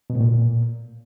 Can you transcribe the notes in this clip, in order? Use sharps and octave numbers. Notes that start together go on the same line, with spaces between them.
B2
A2
A#2